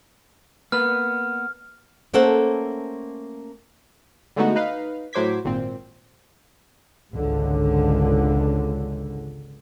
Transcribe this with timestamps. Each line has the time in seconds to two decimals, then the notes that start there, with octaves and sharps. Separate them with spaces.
0.72 A#3 B3 B4 F6
2.13 A3 A#3 C#4 A4 C5 F#5
4.36 D3 G#3 A3 B3 D#4 F#4
4.56 D#4 B4 F5
5.13 A2 F#3 C5 D6 G#6 B6
5.44 G#1 A#2 C4
7.11 G#1 C#2 D3